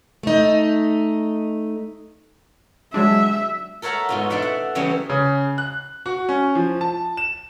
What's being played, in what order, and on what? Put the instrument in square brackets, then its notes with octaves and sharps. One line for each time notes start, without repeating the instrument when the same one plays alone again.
[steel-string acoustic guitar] A3 D#4
[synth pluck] F#3 G#3 D4 [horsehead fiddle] E5
[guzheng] A4 A#4 C#5 E5 F#5 A#5
G#2 B2 F4
A3 D4 D5 E5 F#5
F#5
C#3 E3 F#3 G3 B3 C#4
[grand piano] C#3
F#6
F#4
C#4
F3
A5
E7